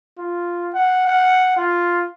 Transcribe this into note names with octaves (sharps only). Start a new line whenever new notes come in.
F4
F#5
F#5
F4